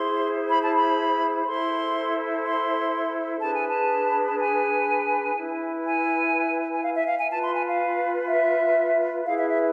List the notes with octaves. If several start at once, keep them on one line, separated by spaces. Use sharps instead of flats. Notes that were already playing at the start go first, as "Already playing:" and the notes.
Already playing: E4 G#4 C5 C6
B5
A5
B5
E4 A4 C5 C6
C6
D4 G#4 B4 A5
G#5
A5
A5
G#5
E4 B4
G#5
G#5
F5
E5
F5
G#5
F4 B4 A5
C6
G#5
F5
E5
E4 G#4 B4 F5
E5
E5